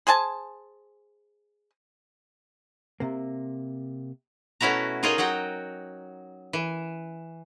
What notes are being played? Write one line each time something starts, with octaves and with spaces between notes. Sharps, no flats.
G#4 C5 G#5 A5
C3 A#3
B2 A3 C#4 E4 F#4 A#5
D#4 F4 G#4 A#4 C#5 D#5
F#3 F#4 F#5 G5
E3